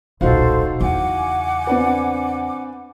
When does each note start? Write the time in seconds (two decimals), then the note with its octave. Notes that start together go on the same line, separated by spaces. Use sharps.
0.21 D#1 B1 D#4 F#4 A4 C5 F5
0.81 E2 C#3 F#5 G#5 D6
1.67 C4 D4 B4